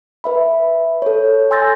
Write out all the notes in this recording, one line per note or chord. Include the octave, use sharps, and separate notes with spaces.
B4 E5 B5
A4 C#5
G#5 C6 E6 G6 A6 A#6